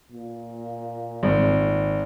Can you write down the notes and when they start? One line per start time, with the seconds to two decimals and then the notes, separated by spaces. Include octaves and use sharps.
0.12 A#2
1.23 G#1